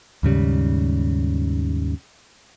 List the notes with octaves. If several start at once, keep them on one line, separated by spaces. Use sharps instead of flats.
D#2 G#2 C#3 G3